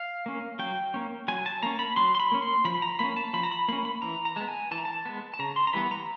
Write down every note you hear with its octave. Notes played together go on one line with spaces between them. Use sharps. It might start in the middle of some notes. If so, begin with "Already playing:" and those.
Already playing: F5
A#3 C#4
F#3 G5
A#3 C#4
F#3 G#5
A5
A#3 C#4 A#5
B5
F#3 C6
C6
B5
A#3 C#4
C6
F3 B5
A#5
A#3 C#4 B5
A5
F3 B5
A#5
B5
A#3 C#4 B5
B5
E3 A#5
A#5
G#3 B3 A5
G#5
E3 A5
A#5
A5
G#3 B3
A5
C#3 A#5
C6
A#5
E3 G3 B3 B5
A#5